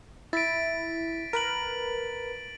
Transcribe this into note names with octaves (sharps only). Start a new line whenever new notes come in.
E4 A6 B6 D7
A#4 B4 D7 F#7